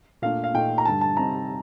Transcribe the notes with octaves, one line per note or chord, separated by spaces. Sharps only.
A#2 A3 D4 F5
F5
A#2 A3 D#4 G5
A#5
G2 D3 G3 A5
A5
C3 G3 C4 D#4 A#5